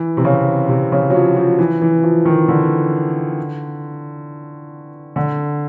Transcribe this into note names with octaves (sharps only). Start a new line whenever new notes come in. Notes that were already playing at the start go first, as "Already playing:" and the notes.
Already playing: E3
C3
C#3
C3
C#3
F#3
F3
F3
E3
E3
F3
D#3
D3
D3